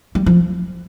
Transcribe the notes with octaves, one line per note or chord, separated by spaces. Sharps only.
G3
F3